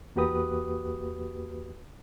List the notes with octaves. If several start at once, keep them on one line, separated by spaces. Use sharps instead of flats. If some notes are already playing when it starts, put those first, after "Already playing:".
E2 A#3 F#4 G4 B4 D#6